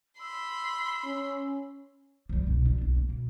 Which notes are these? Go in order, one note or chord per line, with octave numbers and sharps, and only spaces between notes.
B5 C6 E6
C#4
F3 G3
C2 B2
D4
B1
A#3
B2